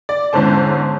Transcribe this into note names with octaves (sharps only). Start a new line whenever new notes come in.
D5
E2 G#2 D3 C#4 C5 A5